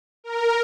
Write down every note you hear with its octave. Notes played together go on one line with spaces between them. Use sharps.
A#4